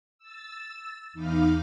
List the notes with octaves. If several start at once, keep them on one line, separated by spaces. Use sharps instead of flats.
E6 A6
E2 D#4 F5 B5 D6 F6